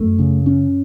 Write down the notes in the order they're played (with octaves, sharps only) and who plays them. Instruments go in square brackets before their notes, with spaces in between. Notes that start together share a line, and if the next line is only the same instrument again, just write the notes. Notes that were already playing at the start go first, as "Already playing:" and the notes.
Already playing: [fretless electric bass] F#2 [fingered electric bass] A3
[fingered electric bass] C#3
C#4